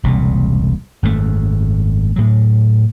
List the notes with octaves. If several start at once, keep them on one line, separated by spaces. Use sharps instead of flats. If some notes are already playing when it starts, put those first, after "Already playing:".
E1 C2 A#2
G#1 F#2 A2 A3
A2 F#3